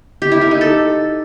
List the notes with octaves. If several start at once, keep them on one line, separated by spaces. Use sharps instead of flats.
G4
E4
A#4
D#4
A4